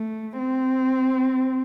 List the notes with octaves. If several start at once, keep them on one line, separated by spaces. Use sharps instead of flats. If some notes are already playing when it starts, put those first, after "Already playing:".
Already playing: A3
C4